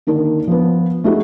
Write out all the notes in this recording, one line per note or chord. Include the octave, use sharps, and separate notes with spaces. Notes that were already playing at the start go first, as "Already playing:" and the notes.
D3 D#3 A#3 D4
F3 B3
A3 D#4 E4 F#4 G#4